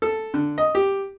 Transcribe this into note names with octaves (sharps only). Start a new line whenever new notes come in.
A4
D3
D#5
G4